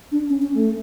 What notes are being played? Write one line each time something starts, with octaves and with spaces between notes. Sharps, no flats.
D4
C#4
C#4
A3